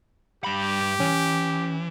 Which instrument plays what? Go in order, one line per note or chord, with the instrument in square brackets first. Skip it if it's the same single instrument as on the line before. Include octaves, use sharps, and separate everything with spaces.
[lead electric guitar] G2 B5 [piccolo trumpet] G4
[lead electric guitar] E3 [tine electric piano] C#4